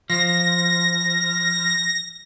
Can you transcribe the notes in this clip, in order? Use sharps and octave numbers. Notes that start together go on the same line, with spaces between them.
F3 A#6